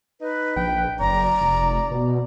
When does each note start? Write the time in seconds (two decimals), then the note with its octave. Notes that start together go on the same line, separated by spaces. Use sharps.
0.21 D#4 B4
0.56 A#1 G5
1.00 F#1 D5 A#5
1.41 F1
1.91 B2